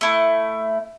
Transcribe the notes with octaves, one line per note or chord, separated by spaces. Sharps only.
A3 E4